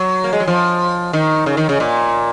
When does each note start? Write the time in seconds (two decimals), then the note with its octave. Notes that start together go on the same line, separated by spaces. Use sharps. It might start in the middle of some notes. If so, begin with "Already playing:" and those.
Already playing: F#3
0.24 A#3
0.33 G#3
0.40 F#3
0.47 F3
1.13 D#3
1.46 C#3
1.57 D#3
1.69 C#3
1.80 A#2